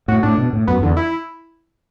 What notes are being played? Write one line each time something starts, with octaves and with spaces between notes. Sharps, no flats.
A2 F#4
A2 D4
B2
A2
F#2 B3
E2 D3
E4